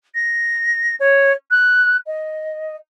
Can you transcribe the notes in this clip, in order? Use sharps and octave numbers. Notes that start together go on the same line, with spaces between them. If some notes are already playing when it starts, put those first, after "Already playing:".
A#6
C#5
F#6
D#5